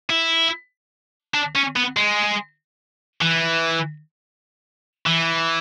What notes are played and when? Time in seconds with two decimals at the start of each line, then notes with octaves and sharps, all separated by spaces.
0.10 E4
1.34 D4
1.55 C#4
1.76 B3
1.97 G#3
3.21 E3
5.07 E3